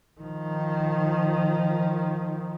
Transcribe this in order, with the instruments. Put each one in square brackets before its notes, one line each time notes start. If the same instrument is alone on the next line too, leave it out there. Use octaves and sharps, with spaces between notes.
[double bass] D#3 F3